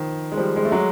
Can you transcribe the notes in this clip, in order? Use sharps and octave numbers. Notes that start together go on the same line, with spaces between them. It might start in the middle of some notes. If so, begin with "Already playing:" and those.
Already playing: D#3 F3
G#3
F3 G3
G#3
A3
F#3 G#3